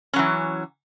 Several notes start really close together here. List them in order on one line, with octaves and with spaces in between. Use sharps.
C#4 F#3 E3